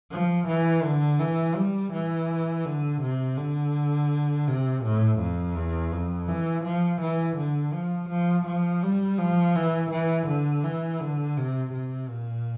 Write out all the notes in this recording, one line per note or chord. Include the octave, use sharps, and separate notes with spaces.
F3
E3
D3
E3
G3
E3
D3
C3
D3
C3
A2
F2
E2
F2
E3
F3
E3
D3
F3
F3
F3
G3
F3
E3
E3
D3
E3
D3
C3
C3
A#2